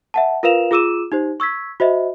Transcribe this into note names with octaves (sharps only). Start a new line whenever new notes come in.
E5 F#5 A5
F4 A#4 B4 F5 E7 F7
F4 G#4 D6 E6 D#7 E7
D#4 G4 C5
C#6 E6 G#6 B6
F#4 C5 D#5 E5